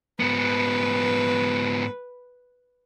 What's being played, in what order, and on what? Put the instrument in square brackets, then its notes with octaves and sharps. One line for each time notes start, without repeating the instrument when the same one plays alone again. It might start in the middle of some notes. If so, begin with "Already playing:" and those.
[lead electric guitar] G#2 B3 [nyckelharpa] B4